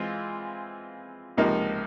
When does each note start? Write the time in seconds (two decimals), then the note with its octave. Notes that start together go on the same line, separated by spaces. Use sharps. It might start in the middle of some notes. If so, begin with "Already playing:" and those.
Already playing: E3 G#3 C4 F4
1.37 C#2 C3 F3 A#3 D#4